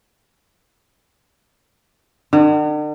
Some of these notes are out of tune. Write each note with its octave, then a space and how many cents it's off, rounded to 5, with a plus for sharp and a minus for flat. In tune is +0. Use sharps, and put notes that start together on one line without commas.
D3 +45